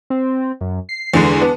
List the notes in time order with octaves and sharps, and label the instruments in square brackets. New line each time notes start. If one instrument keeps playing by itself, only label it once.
[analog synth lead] C4
F#2
C7
[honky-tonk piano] E2 D3 G#3
[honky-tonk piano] B3 [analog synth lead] D4